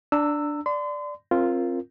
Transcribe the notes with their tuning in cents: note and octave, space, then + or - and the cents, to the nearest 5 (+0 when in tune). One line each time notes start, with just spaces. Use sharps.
D4 +0 A#5 -35 E6 +0
D5 +0 C6 -40
C4 +25 F4 -5 A#4 +0